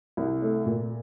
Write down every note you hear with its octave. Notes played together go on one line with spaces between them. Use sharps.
C2
A3
A#2